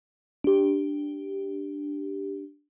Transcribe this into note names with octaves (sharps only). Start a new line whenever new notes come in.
D4 G4